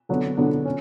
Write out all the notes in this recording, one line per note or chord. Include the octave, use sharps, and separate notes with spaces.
D3 F#3 B3 D4
D3 F#3 B3 D4
C#4